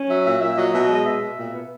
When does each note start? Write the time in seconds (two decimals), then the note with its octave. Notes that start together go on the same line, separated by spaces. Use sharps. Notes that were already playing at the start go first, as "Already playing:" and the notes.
Already playing: C#4
0.09 F#3 E5
0.25 A#2 E5
0.41 A#2 E5
0.57 F#3 D#5
0.73 B2 E5
0.84 D#5
0.89 G#3
0.95 D#5
1.06 B2 E5
1.22 B2
1.37 A#2
1.53 B3